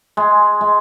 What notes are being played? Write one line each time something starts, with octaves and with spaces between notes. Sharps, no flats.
G#3
G#3